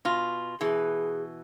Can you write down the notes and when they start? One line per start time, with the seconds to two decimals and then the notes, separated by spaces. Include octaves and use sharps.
0.05 B2 F4
0.61 B2 E3 G#4